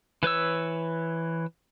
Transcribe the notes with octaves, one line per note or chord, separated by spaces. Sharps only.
E3 B4 C#5 E6